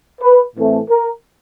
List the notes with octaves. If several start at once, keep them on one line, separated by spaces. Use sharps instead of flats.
B4
A2 E3 A3 C4
A#4